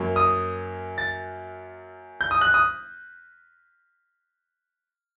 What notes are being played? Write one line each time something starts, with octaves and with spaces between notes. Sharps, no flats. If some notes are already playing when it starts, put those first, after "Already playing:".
Already playing: F#2 F#3 A#3
D#6
A6
G6
D#6
F#6
D#6